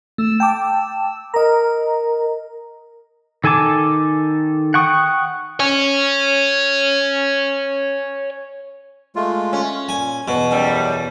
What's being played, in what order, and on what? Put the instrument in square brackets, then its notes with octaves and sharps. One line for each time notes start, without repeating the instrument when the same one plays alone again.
[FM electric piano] A3 [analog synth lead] E6
[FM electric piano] G5 A5 D6
[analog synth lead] A#4 [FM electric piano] D#5 A#5
[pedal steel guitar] D#3 A4 G#5 A5 D6
F#5 G5 C#6 D#6
[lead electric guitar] C#5 G#5
[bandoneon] G#3 A3 F4
[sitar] C#4
[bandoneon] A#2 [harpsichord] G#5
[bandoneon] E2 [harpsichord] B2
[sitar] F#2 G3